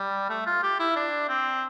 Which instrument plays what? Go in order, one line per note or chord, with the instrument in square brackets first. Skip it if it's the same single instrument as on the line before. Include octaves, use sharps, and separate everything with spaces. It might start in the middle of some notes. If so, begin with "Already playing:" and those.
Already playing: [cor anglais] G3
A3
F4
G4
E4
D4
C4